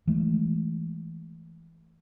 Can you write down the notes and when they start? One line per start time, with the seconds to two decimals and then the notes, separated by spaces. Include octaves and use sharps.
0.07 E3 G#3 A3